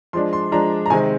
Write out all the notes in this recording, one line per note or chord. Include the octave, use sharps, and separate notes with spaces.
F3 G#3 D4 C6
C6
F3 G#3 D4 A#5
A#5
C3 D#3 G#3 C4 G#5